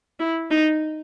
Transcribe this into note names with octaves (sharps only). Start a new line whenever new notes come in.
E4
D#4